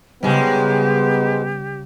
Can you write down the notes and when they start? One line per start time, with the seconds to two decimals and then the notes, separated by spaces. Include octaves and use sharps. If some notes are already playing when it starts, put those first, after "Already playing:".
0.23 G#2 C#3 G3 G#3 B3 G4